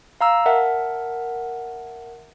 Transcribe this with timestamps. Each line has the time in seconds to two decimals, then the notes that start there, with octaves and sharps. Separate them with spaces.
0.21 F5 A#5 E6
0.46 A#4 E5 F#5 A5